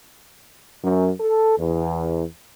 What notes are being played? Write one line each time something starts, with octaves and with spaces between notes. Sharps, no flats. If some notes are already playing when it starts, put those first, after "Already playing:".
F#2
A4
E2